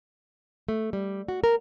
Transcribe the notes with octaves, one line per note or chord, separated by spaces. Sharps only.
A3
G3
F#4
A#4